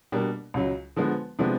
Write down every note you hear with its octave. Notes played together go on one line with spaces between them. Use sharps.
B2 G3 A#3 D4
C#2 C#3 F#3
D3 F3 G#3 B3
C3 F3 G#3 B3 D4